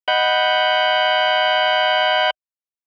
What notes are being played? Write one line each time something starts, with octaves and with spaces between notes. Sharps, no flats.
D#5 F#5 B5 G6